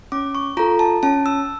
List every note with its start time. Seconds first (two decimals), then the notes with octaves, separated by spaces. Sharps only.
0.12 C#4 D6
0.35 C#6
0.57 F4 A4 A#5
0.79 A5
1.03 C#4 A5
1.26 E6